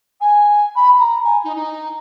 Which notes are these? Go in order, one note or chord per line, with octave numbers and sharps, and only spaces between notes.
G#5
B5
A#5
G#5
D#4
D#4